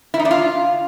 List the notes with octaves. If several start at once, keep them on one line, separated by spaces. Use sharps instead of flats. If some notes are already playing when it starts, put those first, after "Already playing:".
E4
D#4
D4
F4